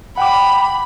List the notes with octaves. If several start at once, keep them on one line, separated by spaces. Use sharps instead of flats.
F#5 G5 B5 D6